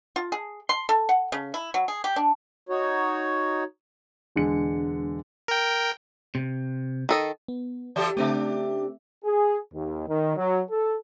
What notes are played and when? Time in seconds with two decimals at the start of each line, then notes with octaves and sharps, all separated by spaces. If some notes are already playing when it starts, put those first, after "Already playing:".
0.16 F4
0.32 G#4
0.69 C6
0.89 A4
1.09 F#5
1.32 C#3
1.54 E4
1.74 F#3
1.88 G#4
2.04 G4
2.16 D4
2.69 D#4 F#4 C#5
4.36 E1 D3 G#3 C#7
5.48 A#4 G5
6.35 C3
7.09 D#3 A4 D#5
7.48 B3
7.96 E3 G4 A4 D5 E5 E6
8.17 C#3 A3 C4 D4 G4 E5
9.25 G#4
9.73 D#2
10.08 D#3
10.37 F#3
10.70 A4